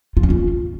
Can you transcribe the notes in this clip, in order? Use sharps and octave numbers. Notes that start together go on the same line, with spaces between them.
F4
C#4
F4